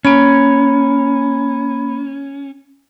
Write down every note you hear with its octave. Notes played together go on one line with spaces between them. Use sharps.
A#3 C#4 B5